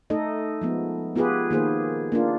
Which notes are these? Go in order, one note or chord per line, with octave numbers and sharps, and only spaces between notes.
A3 D#4 A4 D#5
F3 G#3 B3
B3 F4 G4 G#4 B4
D#3 A#3 G#4 C5
A#3 D4 F4